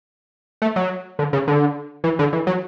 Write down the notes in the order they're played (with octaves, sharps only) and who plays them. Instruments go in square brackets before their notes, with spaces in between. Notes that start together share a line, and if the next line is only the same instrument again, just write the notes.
[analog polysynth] A3
F#3
D3
C#3
D3
E3
D3
E3
F#3